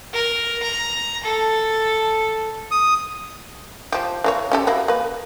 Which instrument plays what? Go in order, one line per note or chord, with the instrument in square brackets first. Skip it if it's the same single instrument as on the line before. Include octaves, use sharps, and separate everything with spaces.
[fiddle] A#4
A#5
A4
[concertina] D#6
[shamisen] F3 G4
E3 A#3 C#5
C#4 G4 A4
F#3 A#3 E4
A#3 B4